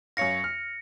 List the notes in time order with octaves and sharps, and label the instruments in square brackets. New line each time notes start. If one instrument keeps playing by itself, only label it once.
[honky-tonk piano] F#2 C#5 F5 [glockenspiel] A#6 C#7
[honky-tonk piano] F6